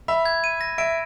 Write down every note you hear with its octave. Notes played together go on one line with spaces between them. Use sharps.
E5 B5
G#6
D#7
A#6
E5 D7